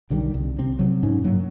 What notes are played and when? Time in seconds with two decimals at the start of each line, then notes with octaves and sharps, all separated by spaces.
0.10 B1 D3 D#3 G3
0.34 C2
0.59 C3 C4
0.79 C3 F#3
1.03 G#2 C#4
1.24 G2 F#3 A#3